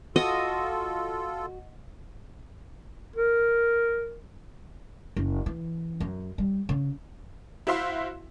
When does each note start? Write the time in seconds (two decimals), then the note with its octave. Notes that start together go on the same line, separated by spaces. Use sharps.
0.16 F4 F#4 A4 D#5
3.16 A#4
5.16 F#1
5.46 E3
6.00 F#2
6.38 G3
6.69 C#3
7.67 E4 F#4 C5 E5 F5 C6